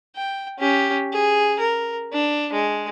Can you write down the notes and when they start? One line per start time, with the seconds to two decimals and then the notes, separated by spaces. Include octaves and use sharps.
0.16 G5
0.59 C#4 G4
1.12 G#4
1.60 A#4
2.13 D4
2.53 G#3